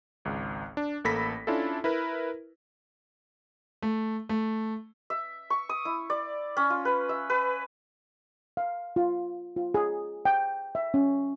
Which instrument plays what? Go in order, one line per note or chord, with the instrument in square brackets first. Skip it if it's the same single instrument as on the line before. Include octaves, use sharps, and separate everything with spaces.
[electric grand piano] G#1 C#2
D4
A1 A#3 A4 B5 A#6 B6
C#4 D4 E4 F4 A4
E4 A#4 B4
[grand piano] A3
A3
[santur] E5
C#6
D#6
E4
D5
C#4
F4
B4
E5
B4
[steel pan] F5
F4
F4
G#4
G5
E5
C#4